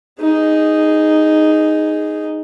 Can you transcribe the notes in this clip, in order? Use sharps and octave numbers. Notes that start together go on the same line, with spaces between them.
D#4 G#4